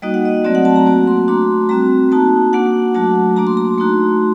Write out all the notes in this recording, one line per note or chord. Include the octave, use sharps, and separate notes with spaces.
G3 A#3 D#4 F#4 D#5
F#5
D#5
F#3 A3 C4 F#4 D5
F#5
A5
A#5
A#3 F#4 A#5
C6
A3 D4 F#4 C6
G3 C4 F#4 A#5
A#3 D#4 F#4 A5
A#3 D4 F#4 F#5
F#3 A3 D4 F#4 A5
A#3 D4 F#4 A#5
C6
A#5
A3 D#4 F#4 C6